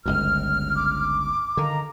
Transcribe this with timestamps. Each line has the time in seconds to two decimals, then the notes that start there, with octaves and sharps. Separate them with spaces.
0.06 G1 C#2 F#2 F6
0.76 D6
1.57 D3 D#3 D#5 F5 A#5